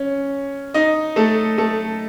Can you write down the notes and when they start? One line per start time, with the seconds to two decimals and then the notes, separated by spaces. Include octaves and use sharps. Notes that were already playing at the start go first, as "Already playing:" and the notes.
Already playing: C#4
0.74 D#4 D#5
1.16 A3 A4
1.58 A3 A4